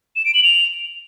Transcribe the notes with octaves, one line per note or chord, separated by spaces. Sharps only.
E7
D7
F#7
F7